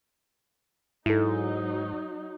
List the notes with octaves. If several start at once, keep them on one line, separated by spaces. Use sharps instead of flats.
G#2 F#3 D#4 E4 A4